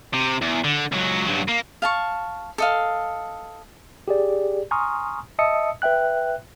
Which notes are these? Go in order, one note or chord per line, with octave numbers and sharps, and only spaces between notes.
C3
E2
D3
C#2 F#3
G2 F#3
A#3
F5 A5 C#6
A4 D#5 F5
G4 G#4 D5
G#5 A#5 C6 C#6 D#6 F6
D#5 E5 A5 D#6 E6 C#7
B4 E5 G5 F#6